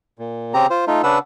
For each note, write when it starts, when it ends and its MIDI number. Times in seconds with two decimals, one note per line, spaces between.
0.19 0.54 46
0.54 0.67 49
0.54 0.67 60
0.54 0.67 67
0.54 0.67 82
0.70 0.85 65
0.70 0.85 72
0.87 1.02 57
0.87 1.02 63
0.87 1.02 65
1.03 1.19 49
1.03 1.19 62
1.03 1.19 71
1.03 1.19 78
1.03 1.19 88